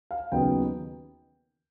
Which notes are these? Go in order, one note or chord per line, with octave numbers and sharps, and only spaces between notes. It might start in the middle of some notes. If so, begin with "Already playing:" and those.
F5
D#2 C#3 F#3 B3 D#4 G5